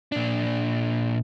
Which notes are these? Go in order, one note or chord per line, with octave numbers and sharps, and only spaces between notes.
A#2 D4